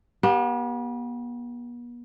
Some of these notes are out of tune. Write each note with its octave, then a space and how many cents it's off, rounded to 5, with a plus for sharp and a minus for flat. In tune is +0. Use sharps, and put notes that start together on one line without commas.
B3 -40 G4 +0